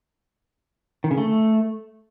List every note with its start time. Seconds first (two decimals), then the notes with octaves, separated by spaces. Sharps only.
1.04 D#3
1.11 C#3
1.18 A3